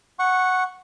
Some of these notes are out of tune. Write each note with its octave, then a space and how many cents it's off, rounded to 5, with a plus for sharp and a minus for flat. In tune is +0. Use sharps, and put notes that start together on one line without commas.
F#5 +0 C#6 -10